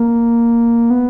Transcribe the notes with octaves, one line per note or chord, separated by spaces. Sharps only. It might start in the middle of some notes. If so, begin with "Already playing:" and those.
Already playing: A#3
B3